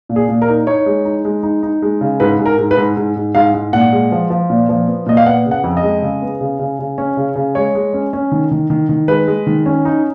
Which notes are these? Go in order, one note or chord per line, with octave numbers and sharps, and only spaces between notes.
A#2
G#4
A#2
A#4
D#4
D#4 C#5
G#3
D#4
G#3
D#4
D#4
G#3
C#3
G#2 B4
G#2
A#4
G#2
B4
G#2
G#2
G#2
G#2 F5
G#2
A#2 F#5
G#3
F3
F3
A#2
F3
B3
A#2 D#5
F5
B3 F#5
C#3
F#5
F2
D#5
G#3
C#3
B3
C#3
C#3
C#3
C#4
C#3
C#3
G#3 C#5
G#3
C#4
C#4
D#3
D#3
D#3
D#3
G#3 B4
G#3
D#3
C#4
D#4